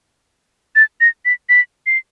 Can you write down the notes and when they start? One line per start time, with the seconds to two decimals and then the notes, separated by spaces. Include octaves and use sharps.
0.76 A6
1.01 A#6
1.25 B6
1.49 B6
1.86 C7